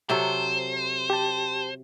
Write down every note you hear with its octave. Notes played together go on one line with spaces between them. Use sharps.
C3 F#3 A4 C5
G4 A5